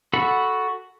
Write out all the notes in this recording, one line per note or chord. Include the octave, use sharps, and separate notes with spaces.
F#4 A4 F#5 B5